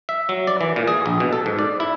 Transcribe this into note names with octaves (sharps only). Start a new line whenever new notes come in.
E5
F#3
D5
E3
A#2
G#4
A#1
B2
A4
G#2
D5
E4